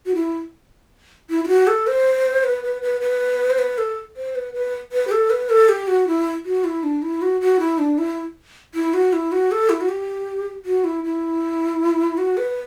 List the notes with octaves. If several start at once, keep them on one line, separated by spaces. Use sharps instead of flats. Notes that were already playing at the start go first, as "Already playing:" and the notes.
F#4
E4
E4
E4
F#4
A4
C5
B4
B4
B4
B4
C5
B4
A4
C5
B4
B4
B4
G4
A4
B4
A4
G4
F#4
E4
F#4
E4
D4
E4
F#4
F#4
E4
D4
E4
E4
F#4
E4
F#4
A4
E4
F#4
G4
F#4
E4
E4
F#4
B4